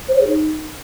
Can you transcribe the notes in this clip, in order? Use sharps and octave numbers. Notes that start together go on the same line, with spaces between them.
C5
C#5
G#4
D#4